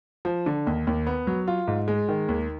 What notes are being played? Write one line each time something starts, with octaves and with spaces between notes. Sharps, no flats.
F3
D3
D#2
D#2
B3
F#3
F4
G#2
G#3
D#3
D#2